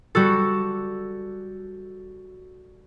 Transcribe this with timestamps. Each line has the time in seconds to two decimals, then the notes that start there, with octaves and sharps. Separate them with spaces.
0.15 G3 F#4 A4